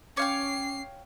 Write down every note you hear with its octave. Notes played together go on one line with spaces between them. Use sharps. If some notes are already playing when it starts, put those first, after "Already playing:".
C#4 C#5 F5 G5 D6 C7